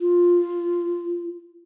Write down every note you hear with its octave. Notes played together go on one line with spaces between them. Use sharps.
F4